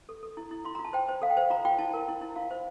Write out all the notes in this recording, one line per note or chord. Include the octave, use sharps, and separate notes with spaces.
A4
A4
E4
E4
F4 C6
A#5
F4
A5
C5 G5
C5
A4 F5
G5
C5 F5
F4 A#5
F4 G5
E4 A5
A#4
E4
E4
F4 F5
C5